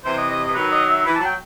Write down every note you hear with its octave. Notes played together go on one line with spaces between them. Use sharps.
C3 E3 C5
D#5
D#5
D#5
E3
D#3 F#3 B4
D#5
E5
E3 B5
F#3 A5
G5